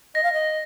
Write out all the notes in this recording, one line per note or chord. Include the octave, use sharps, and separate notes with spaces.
D#5 A#6
F5
D#5